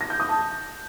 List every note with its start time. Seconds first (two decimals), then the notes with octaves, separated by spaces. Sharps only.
0.01 A#6
0.10 G6
0.20 D#6
0.29 A5